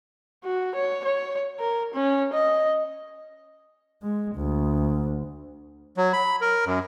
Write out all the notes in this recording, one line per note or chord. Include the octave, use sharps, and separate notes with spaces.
F#4
C#5
C#5
A#4
C#4
D#5
G#3
D2
F#3
B5
A#4
F#2